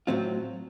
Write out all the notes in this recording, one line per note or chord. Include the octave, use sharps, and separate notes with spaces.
A2 F#3 C4 F4